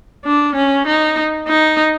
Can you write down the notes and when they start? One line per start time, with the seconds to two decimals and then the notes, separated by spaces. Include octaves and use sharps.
0.25 D4
0.55 C#4
0.87 D#4
1.48 D#4